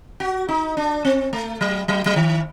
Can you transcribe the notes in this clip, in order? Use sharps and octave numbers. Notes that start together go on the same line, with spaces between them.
F#4
D#4
D4
C4
A3
F#3
F#3
F#3
D#3